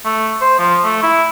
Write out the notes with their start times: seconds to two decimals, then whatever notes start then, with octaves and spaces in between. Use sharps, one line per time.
0.05 A3
0.41 C5
0.59 F3
0.84 A3
1.03 E4